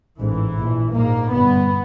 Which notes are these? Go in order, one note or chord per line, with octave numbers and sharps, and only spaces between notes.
A1 G#2 E3
A#1 A#2
A#1 G#2 A#3
G1 G2 B3